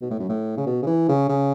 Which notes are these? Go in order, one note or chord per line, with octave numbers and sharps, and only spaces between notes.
B2
A2
F#2
A2
C#3
B2
C#3
E3
C#3
C#3